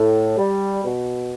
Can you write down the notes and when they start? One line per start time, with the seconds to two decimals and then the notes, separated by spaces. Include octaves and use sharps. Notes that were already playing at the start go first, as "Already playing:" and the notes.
Already playing: A2
0.37 G3
0.84 B2